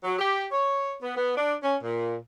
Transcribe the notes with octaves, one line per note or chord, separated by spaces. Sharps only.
F#3
G4
C#5
B3
B3
D4
C#4
A#2